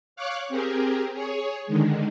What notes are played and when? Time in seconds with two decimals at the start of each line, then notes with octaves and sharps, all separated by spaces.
0.16 C#5 F5 C#6 D6 F#6
0.49 C4 G4 G#4 A#4
1.14 G#4 C#5
1.67 D3 D#3 G#3